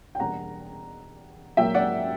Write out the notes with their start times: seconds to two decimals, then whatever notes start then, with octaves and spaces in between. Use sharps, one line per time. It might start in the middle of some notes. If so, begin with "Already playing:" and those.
0.15 G5
0.19 E2 B2 G3 A#3 D4 F#5 A#5
1.57 A#2 F#3 A#3 E5 G5
1.75 D5 F#5